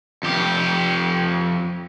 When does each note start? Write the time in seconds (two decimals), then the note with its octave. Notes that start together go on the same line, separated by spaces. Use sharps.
0.23 F2 G4